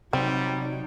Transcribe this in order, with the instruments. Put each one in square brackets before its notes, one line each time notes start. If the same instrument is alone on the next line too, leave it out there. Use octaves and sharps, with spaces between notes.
[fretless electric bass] C3 [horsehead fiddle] F#3 D#4 [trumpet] G3 [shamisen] C4